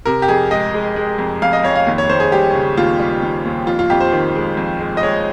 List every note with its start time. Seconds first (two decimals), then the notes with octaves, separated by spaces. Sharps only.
0.06 C3 A#4
0.22 G4
0.28 F2 G#4
0.51 G#3 D#5
0.74 G#3
0.96 G#3
1.18 F2
1.42 F2 F5
1.53 D#5
1.64 F2 C#5
1.76 F5
1.87 D#2
1.98 C#5
2.09 D#2 C5
2.20 G#4
2.32 G3 G4
2.55 C#3
2.77 D#2 F4
2.99 G3
3.22 D#2
3.45 D#2
3.67 F2 F4
3.79 F4
3.90 F2 G4
4.00 C5
4.12 D#3
4.36 G#3
4.57 F2
4.80 G#3
4.97 D#5
5.03 G#3 C#5